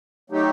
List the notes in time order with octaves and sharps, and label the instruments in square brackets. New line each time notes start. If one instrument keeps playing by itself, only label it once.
[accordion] F#3 A3 D#4 G4